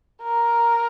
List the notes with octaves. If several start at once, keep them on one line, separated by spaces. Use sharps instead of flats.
A#4